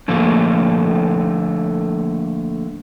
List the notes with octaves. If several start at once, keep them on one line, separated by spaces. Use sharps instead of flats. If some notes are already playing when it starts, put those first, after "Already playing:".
D3 F3 A3 A#3